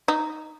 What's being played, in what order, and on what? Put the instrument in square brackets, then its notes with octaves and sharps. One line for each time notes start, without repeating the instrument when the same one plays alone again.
[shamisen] D#4